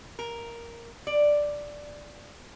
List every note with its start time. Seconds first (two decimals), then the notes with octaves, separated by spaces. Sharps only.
0.19 A#4
1.07 D5